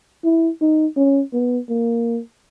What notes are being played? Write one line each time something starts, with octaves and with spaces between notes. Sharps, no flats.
E4
D#4
C#4
B3
A#3